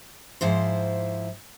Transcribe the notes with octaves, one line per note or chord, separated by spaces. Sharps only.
G#2 F3 E4 C5